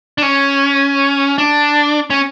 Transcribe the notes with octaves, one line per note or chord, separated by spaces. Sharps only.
D4
C#4
D4
C#4